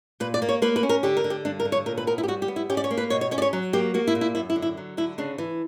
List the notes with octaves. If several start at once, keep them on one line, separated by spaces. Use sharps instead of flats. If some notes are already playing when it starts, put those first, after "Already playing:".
A#2 B4
D5
A#3
C#5
A#3 B4
B4
C#4
A#4
D3 G4
A#4
D3
G4
G2 D4
A#4
D3
C#5
A#2 A#4
B4
B3 A#4
E4
G4
G3 F#4
G4
B3
E4
C#4 G4
D5
C#5
A#3
B4
B2 C#5
C#5
C#4 C#5
D5
C#5
F#3
A#3 G4
A#3 F#4
E4
A#2
E4
F#2 E4
E4
D3
E4
F#3
D3 E4
C#3 D4
E3